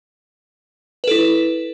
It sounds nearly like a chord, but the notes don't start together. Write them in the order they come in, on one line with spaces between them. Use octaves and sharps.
B4 A4 E4